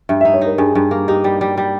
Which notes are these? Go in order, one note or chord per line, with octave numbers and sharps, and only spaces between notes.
G2 E5
D#4 E5
C#5
D#4 A#4
G2 G#4
G2
A#3
D#4 G4
G3
G3
G3